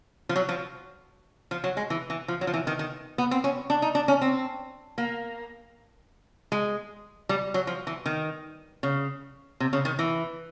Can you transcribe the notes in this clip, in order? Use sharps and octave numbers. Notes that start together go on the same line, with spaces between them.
F3
F#3
F3
F3
F#3
G#3
E3
E3
F3
F#3
F3
E3
D#3
D#3
B3
C4
C#4
D4
D#4
D4
C#4
C4
A#3
G#3
G3
F#3
F3
E3
D#3
C#3
C3
C#3
D#3
E3